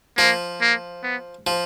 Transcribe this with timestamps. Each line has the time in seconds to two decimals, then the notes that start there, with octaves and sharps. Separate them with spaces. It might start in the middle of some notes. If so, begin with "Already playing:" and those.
0.18 F3 A#3
0.61 A#3
1.03 B3
1.47 F3